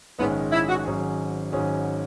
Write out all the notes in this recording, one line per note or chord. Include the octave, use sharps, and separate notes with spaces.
A#1 G#2 D#3 G#3 B3 C#4
E4
F#4
G#1 G#2 F#3 C#4 G#4
G#1 G#2 F#3 C#4 G#4